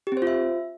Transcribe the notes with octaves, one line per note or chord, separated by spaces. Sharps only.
G4
C4
C5
F4
E5